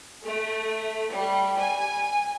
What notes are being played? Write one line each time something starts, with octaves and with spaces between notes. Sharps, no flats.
A3
G3
G#5